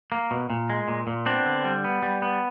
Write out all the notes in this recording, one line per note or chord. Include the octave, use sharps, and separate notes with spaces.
A#3
B2
A#2
G#3
A#2
A#2
B3 C4 D4
D3
G3
B3
G3
B3